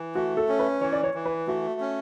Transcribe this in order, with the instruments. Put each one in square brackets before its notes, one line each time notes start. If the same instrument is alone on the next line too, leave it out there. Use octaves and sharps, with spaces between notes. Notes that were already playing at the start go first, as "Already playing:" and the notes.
Already playing: [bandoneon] E3
[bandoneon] A3 [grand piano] F#4
[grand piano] A4
[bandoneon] C#4
[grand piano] B4
[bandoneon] E3 [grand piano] C#5
[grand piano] D5
C#5
[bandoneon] E3
[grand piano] B4
[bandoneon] A3 [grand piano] F#4
[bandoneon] C#4